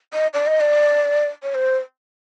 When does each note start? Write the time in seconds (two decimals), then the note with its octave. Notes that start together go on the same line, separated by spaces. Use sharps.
0.13 D#5
0.33 D5
0.46 D#5
0.60 D5
1.42 C#5
1.54 C5